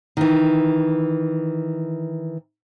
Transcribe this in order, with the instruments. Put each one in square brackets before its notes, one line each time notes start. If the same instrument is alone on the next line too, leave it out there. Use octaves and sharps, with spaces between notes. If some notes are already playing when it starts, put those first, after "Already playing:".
[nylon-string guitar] D#3 E3